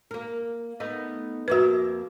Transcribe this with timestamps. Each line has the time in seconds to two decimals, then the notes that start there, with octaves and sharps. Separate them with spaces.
0.11 A#3 A#4
0.80 A3 B3 D#4
1.48 F2 A#3 F#4 B4 E5